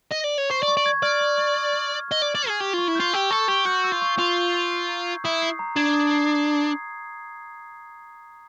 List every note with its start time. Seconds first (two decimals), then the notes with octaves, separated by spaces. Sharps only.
0.11 D#5
0.24 D5
0.38 C#5
0.50 C5 C#6
0.63 D5
0.68 C#6
0.77 D5
0.86 G#6
1.03 D5 F6
1.21 C#6
1.38 C#6
1.55 G#6
1.73 F6
1.91 C#6
2.08 D#5 C#6
2.22 D5
2.26 G#6
2.35 D5
2.43 F6
2.48 G#4
2.60 G4 C#6
2.73 F4 C#6
2.88 E4
2.95 F4 G6
3.13 G4 E6
3.31 A4 C#6
3.48 G4 C#6
3.66 F#4 G6
3.84 E6
3.92 F4
4.02 C#6
4.18 F4 C#6
4.37 G6
4.54 E6
4.72 C7
4.89 A#5
5.06 G#6
5.24 E4 D#6
5.42 C7
5.59 A#5
5.76 D4 G#6
5.94 D#6
6.12 C7